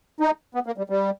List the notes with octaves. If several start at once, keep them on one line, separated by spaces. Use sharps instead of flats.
D#4
B3
A#3
G3
G3